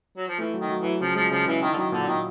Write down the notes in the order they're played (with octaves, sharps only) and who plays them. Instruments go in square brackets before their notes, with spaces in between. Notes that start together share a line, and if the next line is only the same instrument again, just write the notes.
[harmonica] F#3
F3
[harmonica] E3 [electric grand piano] A3
[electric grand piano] F#3
[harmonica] D#3
[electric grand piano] F#3
[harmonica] E3 [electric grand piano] F#3
[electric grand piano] C#3 [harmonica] F3
[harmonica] F3 [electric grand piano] G#3
[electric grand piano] C#3 [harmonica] F3
[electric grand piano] C#3 [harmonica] E3
[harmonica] D#3 [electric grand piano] E4
[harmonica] D3
[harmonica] D#3 [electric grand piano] F#3
[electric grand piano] A#2 [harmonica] D3
[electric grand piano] A#2 [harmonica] D#3